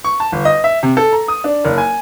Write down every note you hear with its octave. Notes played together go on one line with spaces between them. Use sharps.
C#6
A5
G1
D#5
E5
C3
A4
A#5
D#6
D4
F#1
G#5